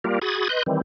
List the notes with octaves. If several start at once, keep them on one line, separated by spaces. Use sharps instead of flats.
G3 A#3 F4 G4 A#4
F#4 G#4 B5 D#6 G#6 A6
B4 D#5 C6 F#6 G6
D#3 E3 G3 C4